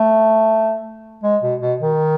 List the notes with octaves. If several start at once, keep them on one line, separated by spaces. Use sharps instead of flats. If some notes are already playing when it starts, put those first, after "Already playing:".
Already playing: A3
G#3
B2
B2
D#3